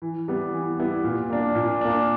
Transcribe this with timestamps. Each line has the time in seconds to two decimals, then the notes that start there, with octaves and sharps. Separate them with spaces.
0.02 E3
0.28 G3 B3 E4
0.53 E3
0.79 G3 B3 E4
1.04 A#2
1.30 A#3 D4
1.55 A#2
1.81 A#3 D4